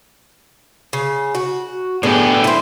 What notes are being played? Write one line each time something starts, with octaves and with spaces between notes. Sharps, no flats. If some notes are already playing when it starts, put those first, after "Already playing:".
C#3
F#4
A2 D3 B3 D4 G4 G#4
E4 C5